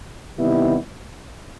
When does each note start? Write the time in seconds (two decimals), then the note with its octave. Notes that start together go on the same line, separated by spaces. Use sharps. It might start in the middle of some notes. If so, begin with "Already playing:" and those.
0.37 C3 D#3 G3 B3 E4